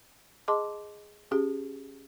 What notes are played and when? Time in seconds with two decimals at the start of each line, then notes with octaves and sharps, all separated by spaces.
0.48 G#4 D#5 A5 C6 D6
1.31 C#4 G4 G#4